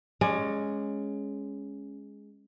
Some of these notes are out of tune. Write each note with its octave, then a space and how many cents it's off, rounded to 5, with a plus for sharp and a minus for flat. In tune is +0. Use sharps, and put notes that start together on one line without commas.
G#3 +0 C#4 +0 D5 +30